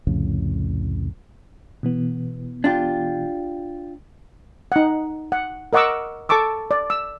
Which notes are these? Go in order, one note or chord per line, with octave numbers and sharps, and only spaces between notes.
C2 F2 A2 C#3
B2 E3 B3
D4 F4 G4
D#4 F#5
F#5
A#4 D#5 F#5 C#6 D6 E6
A4 A5 C#6 D6 E6
D5
E6